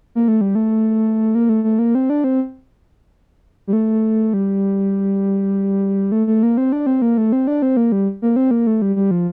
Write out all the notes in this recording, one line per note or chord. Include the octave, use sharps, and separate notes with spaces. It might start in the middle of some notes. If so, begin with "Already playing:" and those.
A#3
A3
G3
A3
A#3
A3
A3
A#3
C4
D4
C4
G3
A3
G3
A3
A3
A#3
C4
D4
C4
A#3
A3
C4
D4
C4
A#3
G3
A#3
C4
A#3
A3
G3
G3
F3